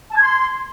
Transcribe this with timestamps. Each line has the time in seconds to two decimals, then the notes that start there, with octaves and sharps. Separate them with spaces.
0.10 A5
0.16 G#6
0.22 C6